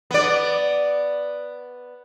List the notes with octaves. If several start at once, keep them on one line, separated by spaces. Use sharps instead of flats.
B3 D5